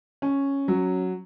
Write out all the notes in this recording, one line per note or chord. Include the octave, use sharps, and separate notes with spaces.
C#4
F#3